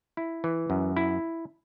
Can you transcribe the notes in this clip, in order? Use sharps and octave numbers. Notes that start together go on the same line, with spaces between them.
E4
E3
F#2
E4